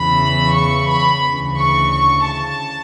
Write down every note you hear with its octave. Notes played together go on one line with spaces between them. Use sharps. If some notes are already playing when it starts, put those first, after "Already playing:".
Already playing: E2 C#3 E3 B5
C#6
B5
D2 C#3 E3
C#6
C#6
A5